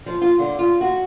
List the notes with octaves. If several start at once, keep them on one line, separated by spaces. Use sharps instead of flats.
F3
F4
D3
F4
F#4